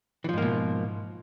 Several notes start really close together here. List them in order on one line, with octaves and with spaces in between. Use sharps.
E3 F3 G#2 A#3 B2